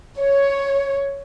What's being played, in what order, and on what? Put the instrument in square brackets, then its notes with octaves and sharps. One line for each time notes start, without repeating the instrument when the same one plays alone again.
[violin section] C#5